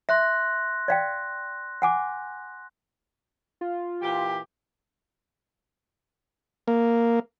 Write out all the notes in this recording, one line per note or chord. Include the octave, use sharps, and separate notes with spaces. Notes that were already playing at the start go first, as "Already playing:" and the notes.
E5 C6 F#6 A#6
D5 F5 G5
F#5 G#5 D6
F4
A#2 E3 G4
A#3